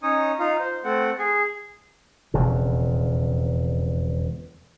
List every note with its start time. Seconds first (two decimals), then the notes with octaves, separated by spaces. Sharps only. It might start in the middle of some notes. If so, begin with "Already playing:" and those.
0.03 C#4 D#4 C#5 D#6
0.39 D#4 F4
0.60 C5
0.84 A3 C4 F#5
1.19 G#4
2.34 E1 F2 C#3